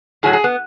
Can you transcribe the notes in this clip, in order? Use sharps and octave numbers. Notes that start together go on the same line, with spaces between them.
A2 F#3 G#4
G#4
B3